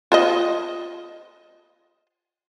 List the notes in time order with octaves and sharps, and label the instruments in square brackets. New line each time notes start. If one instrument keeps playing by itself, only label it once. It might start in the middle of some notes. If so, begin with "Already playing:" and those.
[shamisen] F4 C5 D#5